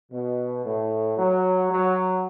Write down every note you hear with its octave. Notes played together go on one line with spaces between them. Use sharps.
B2
A2
F#3
F#3